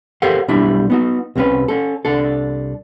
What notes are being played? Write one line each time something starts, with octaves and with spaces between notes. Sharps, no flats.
G4 A4 A#4 C5 F5 F#5
B1 G3 D4 E4 E5
B3 D#4 F#4
C2 C3 A#3 C#4 B4
C#4 A4
C2 D4 A4